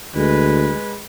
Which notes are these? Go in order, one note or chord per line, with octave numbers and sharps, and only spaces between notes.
D2 G#3 B4